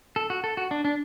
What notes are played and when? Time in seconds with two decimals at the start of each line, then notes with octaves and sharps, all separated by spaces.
0.16 A4
0.30 F#4
0.44 A4
0.57 F#4
0.71 D4
0.85 D4